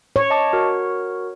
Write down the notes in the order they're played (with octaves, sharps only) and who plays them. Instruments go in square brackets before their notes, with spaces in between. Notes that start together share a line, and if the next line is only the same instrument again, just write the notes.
[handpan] C#5
[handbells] D#5 A5 D6
F#4 A#4